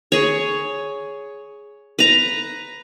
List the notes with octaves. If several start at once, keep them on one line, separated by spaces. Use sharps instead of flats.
G#4 C#5
B4 A#5